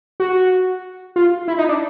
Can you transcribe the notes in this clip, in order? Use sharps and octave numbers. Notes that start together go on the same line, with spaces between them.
F#4
F4
E4
D#4
D4